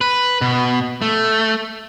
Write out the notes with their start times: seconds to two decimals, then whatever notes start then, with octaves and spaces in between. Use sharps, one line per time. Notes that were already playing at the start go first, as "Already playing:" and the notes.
0.01 B4
0.41 B2
1.02 A3